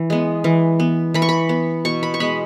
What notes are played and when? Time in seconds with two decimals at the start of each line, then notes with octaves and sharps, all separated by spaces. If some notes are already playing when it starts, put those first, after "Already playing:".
Already playing: E3
0.10 G#3 B3
0.44 E3
0.80 B3
1.14 E3 B5
1.22 C#6
1.29 B5
1.49 B3
1.85 B2 C#6
2.03 B5
2.14 C#6
2.20 G#3 B3 B5